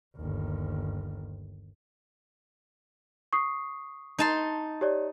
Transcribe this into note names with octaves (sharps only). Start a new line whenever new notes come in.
G1 D#2
C#6 D#6 C7
D#4 A5 C6
G4 C#5 D5